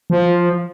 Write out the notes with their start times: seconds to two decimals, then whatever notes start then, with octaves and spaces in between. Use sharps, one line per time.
0.10 F3